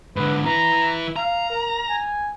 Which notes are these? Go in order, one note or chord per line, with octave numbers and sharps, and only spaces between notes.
G#2 D3 B4
E4 B4 A#5
F5 A#5
A#4
G#5